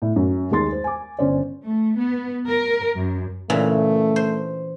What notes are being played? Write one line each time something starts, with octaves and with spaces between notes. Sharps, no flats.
A2
F#2
D#2 G#3 C6 A6
C5
G#5 D6
G1 C#4 C5 D5
A3
B3
A#4
F#2
A#2 C#3 E3 A3
C5